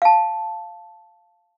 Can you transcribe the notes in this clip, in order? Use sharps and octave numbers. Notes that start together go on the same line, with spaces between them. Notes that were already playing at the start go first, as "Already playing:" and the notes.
F5 A5